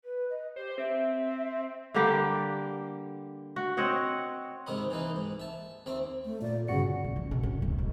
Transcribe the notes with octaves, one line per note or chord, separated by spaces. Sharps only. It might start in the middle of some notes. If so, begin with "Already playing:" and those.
B4
D#5
G4 C5
C4 E5
D3 G3 A#3 G4
F#4
C4 C#5 D#5 F#5
G#2 C3 D#3 D#5 B5
E3 A#3 D#4 B4
G#2
E5 A5
D#2 C4 E5
A3
A#2 D5
G1 C#3 F#4 C#7
B1
F#1 C#4
B2 B3
F#2 F#3
D1
B1